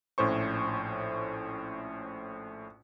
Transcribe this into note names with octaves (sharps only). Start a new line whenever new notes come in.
A#1 A2 C#4 C5 C#6